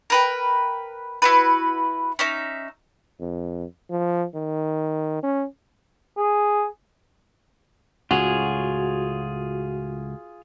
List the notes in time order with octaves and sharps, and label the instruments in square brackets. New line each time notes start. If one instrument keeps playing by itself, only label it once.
[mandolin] A#4 B4 G5
E4 F#4 B4
C#4 D#4 E5
[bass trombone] F2
F3
D#3
C#4
[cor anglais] G#4
[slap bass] C#2 A2 [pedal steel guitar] F4 G#4 C#5 [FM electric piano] F#4